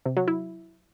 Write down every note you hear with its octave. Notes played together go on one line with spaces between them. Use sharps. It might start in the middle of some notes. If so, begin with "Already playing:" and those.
C3
F#3
E4